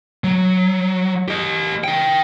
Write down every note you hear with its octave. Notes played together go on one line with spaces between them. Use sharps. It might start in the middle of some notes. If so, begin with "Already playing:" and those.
F#3
G4 D#5
D#4 G5